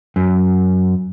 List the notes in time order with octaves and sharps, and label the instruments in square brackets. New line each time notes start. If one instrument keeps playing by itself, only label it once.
[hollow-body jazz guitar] F#2